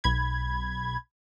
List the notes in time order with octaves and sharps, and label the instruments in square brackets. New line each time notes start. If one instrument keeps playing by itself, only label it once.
[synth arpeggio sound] B1 B5 G#6